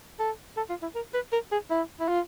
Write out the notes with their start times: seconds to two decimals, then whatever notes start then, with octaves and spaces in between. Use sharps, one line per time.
0.20 A4
0.57 A4
0.70 F4
0.82 E4
0.95 A#4
1.14 B4
1.33 A#4
1.52 G#4
1.70 E4
2.00 E4
2.08 F4